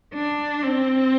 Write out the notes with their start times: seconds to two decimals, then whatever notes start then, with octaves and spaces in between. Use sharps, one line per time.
0.14 D4
0.63 C4